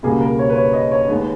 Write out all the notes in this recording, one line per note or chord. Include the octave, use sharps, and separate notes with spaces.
C#2 B2 G3 A#3 G#4
A#4
C#5
B4
C#5
D#5
C#5
D#2 D#3 G#3 B3